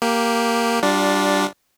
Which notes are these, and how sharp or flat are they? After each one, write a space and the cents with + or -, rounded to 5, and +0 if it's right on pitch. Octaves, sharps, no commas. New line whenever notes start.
A#3 +0 G4 +0
G3 -15 D4 +0 F4 +20